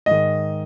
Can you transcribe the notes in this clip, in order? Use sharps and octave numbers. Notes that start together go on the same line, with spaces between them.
G#2 D#3 D#5